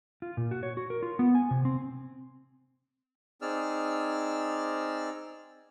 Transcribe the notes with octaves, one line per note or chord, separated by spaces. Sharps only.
F4
A#2
F#4
C#5
F#4
A#4
F4
B3
G#5
C3
C4
C4 D#4 G#4 D5 E6 F6